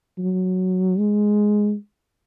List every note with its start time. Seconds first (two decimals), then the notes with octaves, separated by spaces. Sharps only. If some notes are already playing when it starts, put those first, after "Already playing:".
0.19 F#3
0.99 G#3